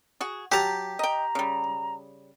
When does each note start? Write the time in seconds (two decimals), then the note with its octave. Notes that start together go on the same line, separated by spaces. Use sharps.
0.21 F#4 G#4
0.52 F#3 G4 A5 A#5
0.99 D#5 G5 A#5
1.35 C#3 G3